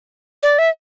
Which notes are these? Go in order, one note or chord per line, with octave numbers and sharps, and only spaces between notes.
D5
E5